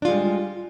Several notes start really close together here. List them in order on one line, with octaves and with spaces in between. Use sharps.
D4 F4 G#3 G3